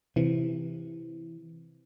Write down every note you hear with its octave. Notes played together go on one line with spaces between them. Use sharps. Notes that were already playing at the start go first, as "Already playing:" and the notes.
C3 E3